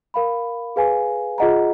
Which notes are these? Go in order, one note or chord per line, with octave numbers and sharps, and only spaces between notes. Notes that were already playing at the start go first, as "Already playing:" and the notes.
A#4 F5 B5
G#4 B4 F5 G#5
F4 G#4 D#5 F#5 A#5